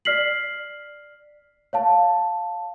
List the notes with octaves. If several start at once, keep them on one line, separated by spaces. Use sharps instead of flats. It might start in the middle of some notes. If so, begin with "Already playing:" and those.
D5 F6 B6 C7 F#7
C#5 F5 A5